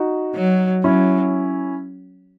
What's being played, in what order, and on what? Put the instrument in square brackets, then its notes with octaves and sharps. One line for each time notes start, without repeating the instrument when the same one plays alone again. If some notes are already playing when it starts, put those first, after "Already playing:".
Already playing: [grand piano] D#4 F#4
[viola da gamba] F#3
[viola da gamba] F#3 [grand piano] C#4 E4